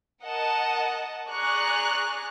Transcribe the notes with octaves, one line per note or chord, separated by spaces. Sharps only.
A#4 D#5 F#5 A5
G#4 D5 A#5 C#6 F#6